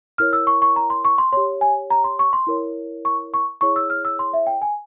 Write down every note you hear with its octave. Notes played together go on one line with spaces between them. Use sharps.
E4 A#4 C#5 F6
E6
C#6
C#6
A#5
C6
C#6
C6
G4 C#5 C6
G#5
A#5
C6
C#6
C6
E4 A#4 C#5
C#6
C#6
E4 G#4 C#5 C#6
E6
F6
E6
C6
E5
G5
G#5